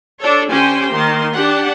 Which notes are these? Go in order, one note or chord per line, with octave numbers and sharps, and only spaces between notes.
D4 A4 C#5
D3 C#4 G4 C5 G5 G#5
D#3 A#3 C6
D4 G4 F#5